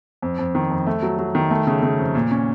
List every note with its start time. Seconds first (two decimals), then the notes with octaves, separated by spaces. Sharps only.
0.22 F2
0.39 F2
0.55 D#3
0.71 F2
0.87 A3
1.03 F#3
1.19 F#3
1.35 D#3
1.51 A3
1.67 C#3
1.83 C#3
1.99 F2
2.15 A#2
2.31 C#4